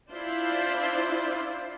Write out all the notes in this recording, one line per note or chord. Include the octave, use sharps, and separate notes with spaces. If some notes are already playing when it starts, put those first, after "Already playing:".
D4 E4 F4 C5 D5